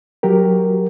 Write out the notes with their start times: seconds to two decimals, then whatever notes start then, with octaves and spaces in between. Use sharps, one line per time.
0.23 F#3 F#4 G4 A#4